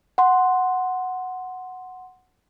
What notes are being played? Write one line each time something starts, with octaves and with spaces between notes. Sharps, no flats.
F#5 C6